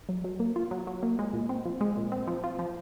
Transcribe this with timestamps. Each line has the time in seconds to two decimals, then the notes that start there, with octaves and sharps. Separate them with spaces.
0.09 F#3
0.24 F#3
0.40 A#3
0.56 F4
0.71 F#3
0.87 F#3
1.03 A#3
1.19 G#3
1.33 A#2
1.49 C4
1.65 F3
1.81 G#3
1.97 A#2
2.12 C4
2.27 F3
2.44 F4
2.59 F3